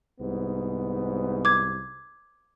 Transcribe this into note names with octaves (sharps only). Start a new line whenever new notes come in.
C2 G#2 B3
D6 G#6